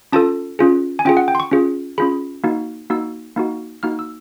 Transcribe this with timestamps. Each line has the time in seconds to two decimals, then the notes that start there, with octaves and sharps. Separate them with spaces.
0.12 C#4 F4 A4 A5
0.59 C#4 F4 G#4
0.99 G#5
1.05 C#4 F4 G#4 G5
1.17 F#5
1.28 G5
1.35 C6
1.40 C#6
1.51 C#4 F4 G#4
1.98 C#4 F4 G#4 B5
2.44 A#3 D#4 F#4
2.90 A#3 D#4 F#4 E6
3.36 A#3 D#4 F#4
3.83 A#3 D#4 F#4 F6
3.99 E6